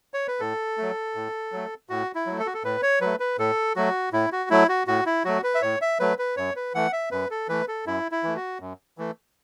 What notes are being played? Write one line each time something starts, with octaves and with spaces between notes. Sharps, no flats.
C#5
B4
A2 A4
F#3 A3
A2
F#3 A3
A2 F#4
E4
F#3
A3
A4
F#4
A4
A2 B4
C#5
F#3 A3 B4
B4
A2 A4
F#3 A3 F#4
A2 E4
F#4
F#3 A3 E4
F#4
A2 F#4
E4
F#3 A3 F#4
B4
E5
A2 C#5
E5
F#3 A3 B4
B4
F#2 C#5
B4
E3 A3 F#5
E5
F#2 B4
A4
E3 A3 B4
A4
F#2 E4
E4
E3 A3
F#4
F#2
E3 A3